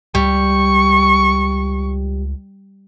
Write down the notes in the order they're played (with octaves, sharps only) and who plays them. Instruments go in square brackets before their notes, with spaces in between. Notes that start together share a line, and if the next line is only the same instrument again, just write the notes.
[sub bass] C#2 [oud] G3 [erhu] C#6